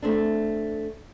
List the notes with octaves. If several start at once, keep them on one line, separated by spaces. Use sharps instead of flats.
A3 C4 D4